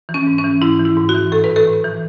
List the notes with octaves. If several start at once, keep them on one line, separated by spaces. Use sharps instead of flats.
E3
C#4
G#2
C#4
E3
G#2 E4
E3
E4
G#2
F#4
E3
A2 A4
B4
E3
A4
A2
E3